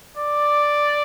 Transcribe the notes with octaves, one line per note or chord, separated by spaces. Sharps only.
D5